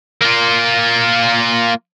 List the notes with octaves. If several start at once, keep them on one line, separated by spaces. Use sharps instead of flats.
A#3 F4